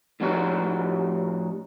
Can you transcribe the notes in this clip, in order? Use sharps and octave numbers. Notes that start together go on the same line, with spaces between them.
A2 F3 G3 C#4 D#4 F#4